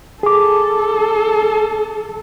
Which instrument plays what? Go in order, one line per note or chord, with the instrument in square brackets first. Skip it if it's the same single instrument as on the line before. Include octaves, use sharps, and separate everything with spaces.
[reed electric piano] G#4 D6 [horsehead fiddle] A4